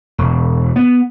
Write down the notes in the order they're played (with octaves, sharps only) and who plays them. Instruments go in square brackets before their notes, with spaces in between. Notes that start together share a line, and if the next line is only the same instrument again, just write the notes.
[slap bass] E1
B3